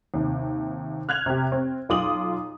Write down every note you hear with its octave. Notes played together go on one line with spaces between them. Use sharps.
D#2 C3
F6 F#6 G#6 F7
C3 G4
C4
B1 F4 D6 D#6 F#7